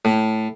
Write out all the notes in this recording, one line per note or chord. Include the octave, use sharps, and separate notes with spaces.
A2